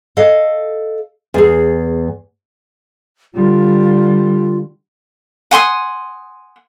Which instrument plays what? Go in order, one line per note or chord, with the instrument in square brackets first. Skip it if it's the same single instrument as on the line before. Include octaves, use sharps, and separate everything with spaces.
[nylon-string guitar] A4 D#5 F5
E2 G#4
[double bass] D3 G3 [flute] F4
[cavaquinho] F#5 G#5 C6 D#6